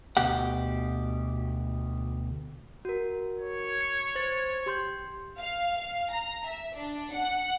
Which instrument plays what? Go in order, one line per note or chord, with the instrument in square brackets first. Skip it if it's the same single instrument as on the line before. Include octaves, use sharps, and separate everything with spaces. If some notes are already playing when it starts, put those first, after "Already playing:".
[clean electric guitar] D2 B2 G4 F#5
[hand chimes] F#4 A#4
[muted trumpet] C#5
[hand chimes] C#7
C5 A6
G4 C6 G6
[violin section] F5
F5
A#5
E5
D4
F#5